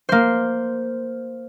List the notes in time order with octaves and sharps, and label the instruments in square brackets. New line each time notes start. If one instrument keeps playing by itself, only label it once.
[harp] A#3 C5